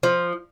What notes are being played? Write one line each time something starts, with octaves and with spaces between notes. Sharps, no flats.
F3